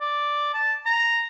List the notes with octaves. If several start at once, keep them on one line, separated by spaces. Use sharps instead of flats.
D5
A5
A#5